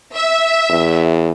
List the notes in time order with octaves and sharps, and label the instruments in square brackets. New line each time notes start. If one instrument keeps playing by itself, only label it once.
[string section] E5
[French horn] E2